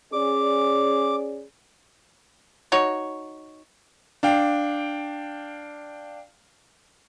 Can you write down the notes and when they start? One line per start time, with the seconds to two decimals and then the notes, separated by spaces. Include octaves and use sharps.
0.13 C#4 G#4 D5 D6
2.72 D#4 F#4 C#5
4.23 D4 F5 G5